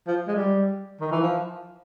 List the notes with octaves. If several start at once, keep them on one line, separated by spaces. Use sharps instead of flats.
F3
G#3
G3
D#3
E3
F3